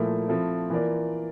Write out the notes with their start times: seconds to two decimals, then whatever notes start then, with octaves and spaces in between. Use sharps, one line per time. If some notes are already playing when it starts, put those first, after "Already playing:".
Already playing: A#2 F3 A3 E4 A#4
0.28 F3 C4 E4 A4
0.70 E3 A#3 F4 A#4 D5